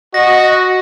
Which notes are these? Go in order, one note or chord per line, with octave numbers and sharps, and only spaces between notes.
F#4 D#5 A#6